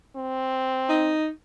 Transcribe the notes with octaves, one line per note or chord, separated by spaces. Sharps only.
C4
D#4